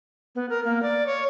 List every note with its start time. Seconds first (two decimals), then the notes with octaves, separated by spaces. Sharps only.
0.35 B3
0.50 A#4
0.65 A#3
0.83 D5
1.06 C#5